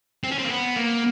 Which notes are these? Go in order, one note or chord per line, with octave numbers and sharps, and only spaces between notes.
C4
C#4
C4
A#3
B3
A#3